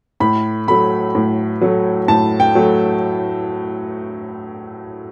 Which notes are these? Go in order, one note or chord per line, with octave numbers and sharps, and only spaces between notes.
A2 B5
F#3 A3 B5
A2
F#3 A3
A2 A5
G5
F#3 A3